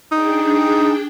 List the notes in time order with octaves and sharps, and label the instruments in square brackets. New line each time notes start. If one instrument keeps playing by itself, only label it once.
[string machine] D4 G#4 G5 [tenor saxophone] D#4